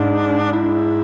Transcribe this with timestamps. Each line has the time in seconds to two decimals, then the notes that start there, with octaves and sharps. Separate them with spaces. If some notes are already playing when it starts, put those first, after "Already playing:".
Already playing: G#2 D4
0.53 E4